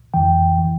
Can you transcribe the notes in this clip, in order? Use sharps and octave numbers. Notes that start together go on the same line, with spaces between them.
F2 E3 G5
E3